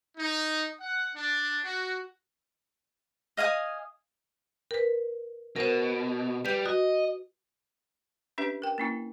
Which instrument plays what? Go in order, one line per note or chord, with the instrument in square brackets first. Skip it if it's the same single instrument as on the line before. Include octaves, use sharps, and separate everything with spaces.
[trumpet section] D#4
F#5
D4
F#4
[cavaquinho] D#5 F5 G#5 D#6
[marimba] A#4 B4
[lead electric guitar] B2 [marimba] A#4 C5
[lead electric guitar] G3 [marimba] B4 G6
[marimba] F#4 [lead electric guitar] D#5
[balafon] C#4 D4 G4 B4 E5
A#4 G5
A#3 C#4 E4